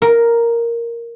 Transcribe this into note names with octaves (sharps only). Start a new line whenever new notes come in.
A#4